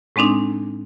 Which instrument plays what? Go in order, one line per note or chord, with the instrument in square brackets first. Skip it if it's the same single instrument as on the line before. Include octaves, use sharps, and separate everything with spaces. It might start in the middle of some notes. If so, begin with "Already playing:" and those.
[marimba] A2 G#3 C4 D4 D#4